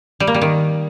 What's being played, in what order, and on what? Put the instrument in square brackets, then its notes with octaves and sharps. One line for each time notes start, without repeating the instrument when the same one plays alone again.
[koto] G3
A#3
G3
D#3